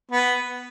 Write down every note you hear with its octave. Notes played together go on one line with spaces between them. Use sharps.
B3